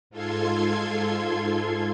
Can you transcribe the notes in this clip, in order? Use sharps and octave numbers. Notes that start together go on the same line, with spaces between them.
G#2 F4 A4 C6 G#6